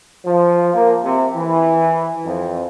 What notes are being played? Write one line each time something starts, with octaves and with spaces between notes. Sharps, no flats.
F3
A#3
C3
E3
F2